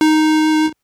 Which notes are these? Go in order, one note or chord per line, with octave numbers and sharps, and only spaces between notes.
D#4